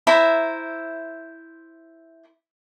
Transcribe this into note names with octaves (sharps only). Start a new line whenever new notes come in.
E4 C5 E5 A#5